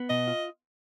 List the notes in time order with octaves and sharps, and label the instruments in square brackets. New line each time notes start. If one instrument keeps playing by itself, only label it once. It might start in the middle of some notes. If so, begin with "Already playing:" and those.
Already playing: [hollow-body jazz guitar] B3
[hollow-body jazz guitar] B2 [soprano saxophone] D#5
[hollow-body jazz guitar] F4